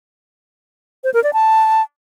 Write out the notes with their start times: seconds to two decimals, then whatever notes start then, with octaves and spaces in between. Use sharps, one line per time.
1.04 C5
1.14 A#4
1.23 D5
1.33 A5